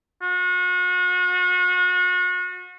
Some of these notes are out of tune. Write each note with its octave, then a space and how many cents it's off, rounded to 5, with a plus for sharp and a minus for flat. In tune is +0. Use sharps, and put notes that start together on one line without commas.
F#4 -35